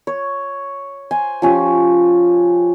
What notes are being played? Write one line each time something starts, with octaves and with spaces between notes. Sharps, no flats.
C#5
C5 G#5 C6
F3 C#4 G4